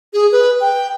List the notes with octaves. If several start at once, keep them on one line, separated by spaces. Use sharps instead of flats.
G#4
B4
G5